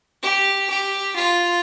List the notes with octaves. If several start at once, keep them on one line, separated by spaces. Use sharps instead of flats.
G4
G4
F4